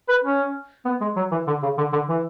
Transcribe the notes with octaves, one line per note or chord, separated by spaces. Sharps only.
B4
C#4
B3
G#3
F#3
E3
D3
C#3
D3
D3
E3